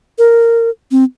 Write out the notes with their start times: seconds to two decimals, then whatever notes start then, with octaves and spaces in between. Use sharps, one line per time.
0.18 A#4
0.91 C4